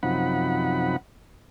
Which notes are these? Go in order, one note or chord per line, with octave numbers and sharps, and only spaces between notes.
F#2 C3 F3 D#4 F#5 B5